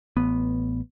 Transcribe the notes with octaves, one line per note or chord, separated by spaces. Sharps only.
A1 B3